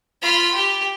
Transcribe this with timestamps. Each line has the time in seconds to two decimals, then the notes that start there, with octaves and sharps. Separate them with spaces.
0.22 F4 B5
0.54 G4